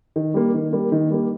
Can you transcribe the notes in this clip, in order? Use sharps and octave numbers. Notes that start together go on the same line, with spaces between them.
D#3
G3 A#3
D#3
G3 A#3
D#3
G3 A#3